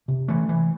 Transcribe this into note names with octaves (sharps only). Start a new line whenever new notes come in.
C3
E3 A3
E3